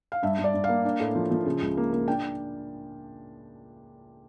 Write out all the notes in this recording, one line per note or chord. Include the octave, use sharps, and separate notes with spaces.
F5
G2 E5
G2
D5
G2
F5
A#3
D4
A2
F3
F3
C#3
C#2
A#3
A#3
D4 G5